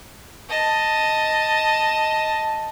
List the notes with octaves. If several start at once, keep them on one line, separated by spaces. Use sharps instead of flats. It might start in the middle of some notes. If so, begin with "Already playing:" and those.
D#5 A5